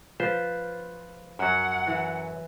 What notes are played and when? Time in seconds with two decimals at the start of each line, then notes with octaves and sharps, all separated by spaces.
0.20 F3 F4 B4 C5
1.39 F#2 F#3 F#5
1.87 E3